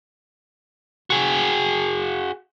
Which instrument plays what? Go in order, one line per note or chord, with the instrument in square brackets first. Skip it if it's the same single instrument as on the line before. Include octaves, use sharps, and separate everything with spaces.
[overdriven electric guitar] F#4 G#4